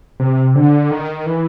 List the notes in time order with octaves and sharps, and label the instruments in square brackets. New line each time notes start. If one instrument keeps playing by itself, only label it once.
[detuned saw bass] C3
D3
D#3
E3